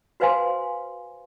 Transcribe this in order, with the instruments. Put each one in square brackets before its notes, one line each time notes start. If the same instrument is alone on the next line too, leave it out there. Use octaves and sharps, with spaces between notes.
[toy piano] F#4 B4 C5 F5 G#5 C6